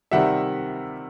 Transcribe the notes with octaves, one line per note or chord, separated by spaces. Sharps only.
C3 D#3 G3 E5 F#5